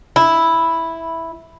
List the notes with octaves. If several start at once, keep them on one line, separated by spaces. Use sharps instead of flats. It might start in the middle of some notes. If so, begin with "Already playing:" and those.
E4